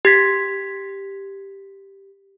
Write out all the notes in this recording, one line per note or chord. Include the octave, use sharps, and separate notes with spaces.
G4 G#6 B6